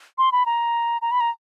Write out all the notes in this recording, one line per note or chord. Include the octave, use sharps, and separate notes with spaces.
C6
B5
A#5
A#5
B5
A#5